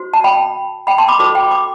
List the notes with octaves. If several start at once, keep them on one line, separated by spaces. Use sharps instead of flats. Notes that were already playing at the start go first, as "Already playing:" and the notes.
Already playing: F#4 C5
A5
G5 B5
G5 B5
A5 C6
B5 D6
F#4 A4 C5 B5 D6
G5 B5
B5 D6